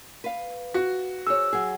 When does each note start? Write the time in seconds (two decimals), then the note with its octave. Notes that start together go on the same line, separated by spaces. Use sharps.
0.24 B4 F5
0.74 F#4
1.27 G#4 C5 C#5 E6
1.53 F#3 G#4